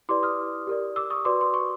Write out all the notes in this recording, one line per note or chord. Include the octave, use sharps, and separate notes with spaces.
E4 G4 B4 D5 C6 D6
D#6 F6
G4 A#4 D5
D6 E6
C#6 D#6
F#4 B4 D5 C6 D6
C6
C#6